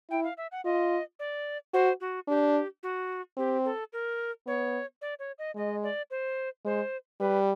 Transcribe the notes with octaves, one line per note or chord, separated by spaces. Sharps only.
E4 G5
F5
E5
F#5
F4 D#5
D5
F#4 C5
F#4
D4 G4
F#4
C4 G4
A4
A#4
B3 C#5
D5
C#5
D#5
G#3 D#5
D5
C5
G#3 C5
G3 B4